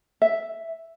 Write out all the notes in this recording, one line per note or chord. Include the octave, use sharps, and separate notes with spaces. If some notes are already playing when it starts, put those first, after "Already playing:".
E5